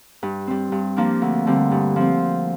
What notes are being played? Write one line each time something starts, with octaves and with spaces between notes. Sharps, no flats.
G2
G3 C4
G2
F3 A#3 D4
D2
D3 G3 C4
G2
F3 C4